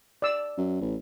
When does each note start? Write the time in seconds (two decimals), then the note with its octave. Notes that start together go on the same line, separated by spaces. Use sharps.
0.22 D5 E6
0.57 F#2
0.81 A1